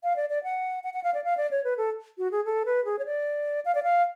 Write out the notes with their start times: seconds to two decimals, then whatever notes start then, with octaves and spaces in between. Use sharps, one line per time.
0.03 F5
0.16 D5
0.30 D5
0.44 F#5
0.84 F#5
0.94 F#5
1.03 F5
1.14 D5
1.24 F5
1.37 D5
1.51 C#5
1.64 B4
1.77 A4
2.18 F#4
2.31 G#4
2.45 A4
2.65 B4
2.85 G#4
2.99 C#5
3.06 D5
3.65 F5
3.75 D5
3.83 F5